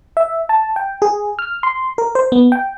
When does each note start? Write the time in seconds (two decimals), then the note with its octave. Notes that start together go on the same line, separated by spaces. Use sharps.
0.17 E5
0.49 A5
0.76 G5
1.02 G#4
1.39 F6
1.63 C6
1.98 A#4
2.15 C5
2.32 B3
2.52 G5